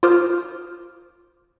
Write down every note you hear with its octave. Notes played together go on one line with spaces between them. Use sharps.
F4 A#4 C5 D6 D#6 F6